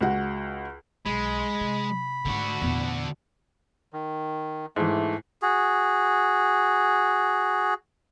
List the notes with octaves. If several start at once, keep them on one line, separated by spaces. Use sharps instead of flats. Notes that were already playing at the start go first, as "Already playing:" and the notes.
C#2 F#4 F#5
B1 G#3 B5
C3
G#2 D3 A3 F#4
E2 A#2
D#3
G#2 E3 A3
F#4 G#4